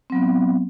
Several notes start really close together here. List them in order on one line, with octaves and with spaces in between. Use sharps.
C4 F#3 B3